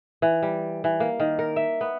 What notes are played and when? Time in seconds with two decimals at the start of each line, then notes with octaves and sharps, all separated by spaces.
0.22 E3
0.43 G3
0.84 E3
1.00 A#3
1.20 D#3
1.39 A#4
1.56 E5
1.81 B3